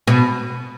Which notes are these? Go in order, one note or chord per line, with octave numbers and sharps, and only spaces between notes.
B2